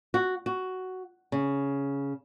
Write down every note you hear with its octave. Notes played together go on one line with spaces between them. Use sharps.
F#4
F#4
C#3